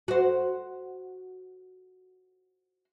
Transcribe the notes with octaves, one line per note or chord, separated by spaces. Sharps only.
F#4 C5